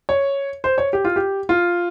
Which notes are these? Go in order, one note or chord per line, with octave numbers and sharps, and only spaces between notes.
C#5
C5
C#5
G4
F4
G4
F4